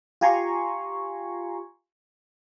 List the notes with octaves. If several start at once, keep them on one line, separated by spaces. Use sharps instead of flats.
F4 G4 G#5 A#5 C6 C#6